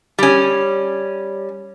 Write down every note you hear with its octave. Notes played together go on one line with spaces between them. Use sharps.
G3 C#4